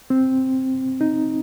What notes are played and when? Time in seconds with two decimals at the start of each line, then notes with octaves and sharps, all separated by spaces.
0.10 C4
1.01 D#4